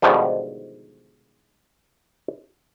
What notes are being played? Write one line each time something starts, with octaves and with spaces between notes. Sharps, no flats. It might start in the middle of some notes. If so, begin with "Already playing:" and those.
G#2 B2 D3 D#3 F3 G3